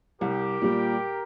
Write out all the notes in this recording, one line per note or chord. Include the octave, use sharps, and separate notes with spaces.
C2 G4 A#4
A#2 G3